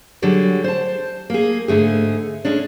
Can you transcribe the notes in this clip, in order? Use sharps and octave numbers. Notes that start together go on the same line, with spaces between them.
D3 F#3 G3 G#4
C5 A5
A#3 G#4
G#2 D3 A3 G#4
G#3 C#4 D4